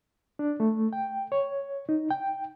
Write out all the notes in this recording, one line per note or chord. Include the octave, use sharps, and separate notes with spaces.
D4
A3
G5
C#5
D#4
G5